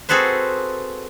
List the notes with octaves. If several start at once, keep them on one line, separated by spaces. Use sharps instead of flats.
C4 F#4 G#4 A4 B4 C5